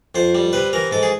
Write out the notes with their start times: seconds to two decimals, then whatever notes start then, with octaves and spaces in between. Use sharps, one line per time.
0.15 F2 C5
0.35 G3
0.53 C3 B4
0.73 E3 A#4
0.91 G#2 A4
1.03 G#4